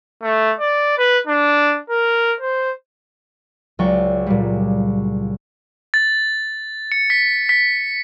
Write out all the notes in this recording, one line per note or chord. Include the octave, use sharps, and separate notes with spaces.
A3
D5
B4
D4
A#4
C5
C#2 F#3 D5 G5 C#6
A#2 G3
A6
C#7
B6
B6